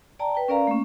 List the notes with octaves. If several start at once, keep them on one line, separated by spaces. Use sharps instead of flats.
D5 G5 A5 A#5
B4 G5
C#4 A#4 D5 F5 A#5
A3 A#3 C#4